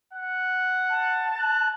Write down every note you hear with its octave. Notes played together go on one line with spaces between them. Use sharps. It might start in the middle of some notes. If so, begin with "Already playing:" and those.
F#5
A5
F#6